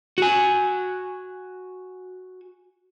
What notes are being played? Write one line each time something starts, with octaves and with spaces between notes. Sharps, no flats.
F#4 G#5